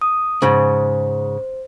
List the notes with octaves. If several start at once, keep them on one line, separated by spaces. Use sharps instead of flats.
D#6
G#2 C#3 C5